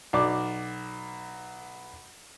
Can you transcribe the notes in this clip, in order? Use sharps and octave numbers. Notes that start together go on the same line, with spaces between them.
B1 D5 D6